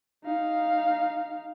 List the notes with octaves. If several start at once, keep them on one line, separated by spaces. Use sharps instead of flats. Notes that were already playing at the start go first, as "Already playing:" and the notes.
D#4 F5